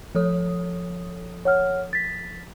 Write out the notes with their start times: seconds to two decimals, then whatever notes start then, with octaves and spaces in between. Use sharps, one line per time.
0.15 F3 A4 C#5 D#6
1.45 C#5 F#5 F6
1.93 A6 B6